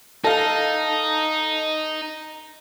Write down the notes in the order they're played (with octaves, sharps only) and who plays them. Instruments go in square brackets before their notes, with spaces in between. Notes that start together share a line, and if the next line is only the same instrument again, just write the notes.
[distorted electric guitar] D#4 [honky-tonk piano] A4 F5